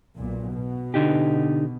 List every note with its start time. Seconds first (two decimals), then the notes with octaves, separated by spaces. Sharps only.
0.17 B1 A#2
0.55 B2
0.94 D3 D#4 G4